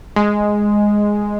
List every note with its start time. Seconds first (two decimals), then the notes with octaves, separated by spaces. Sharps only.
0.16 G#3